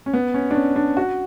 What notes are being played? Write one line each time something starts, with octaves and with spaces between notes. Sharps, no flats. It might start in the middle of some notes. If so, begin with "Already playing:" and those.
C#4
B3
C#4
D4
C#4
D4
F#4